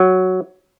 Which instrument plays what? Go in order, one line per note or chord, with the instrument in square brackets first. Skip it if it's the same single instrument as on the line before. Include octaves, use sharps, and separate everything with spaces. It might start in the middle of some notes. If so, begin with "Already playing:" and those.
Already playing: [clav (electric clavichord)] F#3